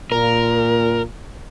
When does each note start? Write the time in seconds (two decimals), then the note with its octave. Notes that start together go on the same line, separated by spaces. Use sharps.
0.12 A#2 A#4